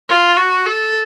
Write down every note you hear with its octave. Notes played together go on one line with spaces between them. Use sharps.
F4
F#4
A4